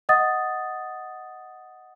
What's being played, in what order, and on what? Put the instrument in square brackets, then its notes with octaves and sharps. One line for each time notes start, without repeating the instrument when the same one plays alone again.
[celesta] D#5 F#5 D#6 A6